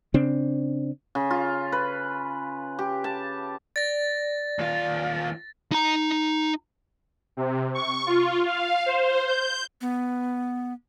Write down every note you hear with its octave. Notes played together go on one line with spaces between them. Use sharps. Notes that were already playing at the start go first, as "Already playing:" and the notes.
C#3 C4 D4
C#3
F4
B4
G4
A5
D5 A6 A#6
D#2 F4
D#4 A#5
C3
C#6
F4
F5
C5
G6
B3